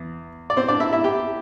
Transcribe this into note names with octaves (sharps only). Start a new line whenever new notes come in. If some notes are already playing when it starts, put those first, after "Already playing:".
Already playing: E2
D5
C4 C5
D4 D5
E4 E5
E4 E5
G4 G5